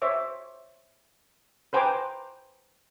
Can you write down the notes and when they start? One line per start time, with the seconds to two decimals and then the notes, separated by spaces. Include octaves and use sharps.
0.02 C5 C#5 E5 D6
1.73 B4 C5 G5 G#5 A#5 D6